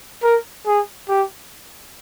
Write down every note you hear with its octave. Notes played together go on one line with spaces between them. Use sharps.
A#4
G#4
G4